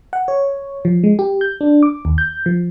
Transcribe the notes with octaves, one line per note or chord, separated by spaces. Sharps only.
F#5
C#5
F3
G#3
G4
G6
D4
D6
D#2
G6
F3